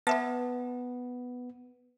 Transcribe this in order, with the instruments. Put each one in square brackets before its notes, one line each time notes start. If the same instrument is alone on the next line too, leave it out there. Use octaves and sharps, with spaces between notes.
[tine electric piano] B3 [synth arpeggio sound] B4 E5 A5